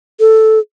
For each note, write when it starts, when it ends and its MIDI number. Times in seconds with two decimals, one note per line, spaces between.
0.20 0.59 69